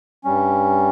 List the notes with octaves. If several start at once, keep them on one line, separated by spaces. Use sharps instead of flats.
G2 G3 C#4